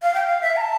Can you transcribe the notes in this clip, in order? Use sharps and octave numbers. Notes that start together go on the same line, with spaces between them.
F5
G5
F5
E5
A#5
A5